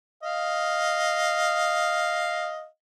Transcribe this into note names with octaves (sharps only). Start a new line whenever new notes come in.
D#5 F5